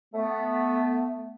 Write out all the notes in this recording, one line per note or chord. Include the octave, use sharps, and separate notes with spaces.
A3 B3